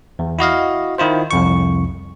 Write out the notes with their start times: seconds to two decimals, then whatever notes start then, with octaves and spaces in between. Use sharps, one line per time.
0.19 E2
0.39 E4 F#4 D#5 F5
0.98 D#3 E4 F4 C5
1.31 C2 F2 C#6